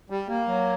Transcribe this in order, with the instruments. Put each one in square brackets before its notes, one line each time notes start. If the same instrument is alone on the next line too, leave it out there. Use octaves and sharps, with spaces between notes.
[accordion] G3
A#3
F#3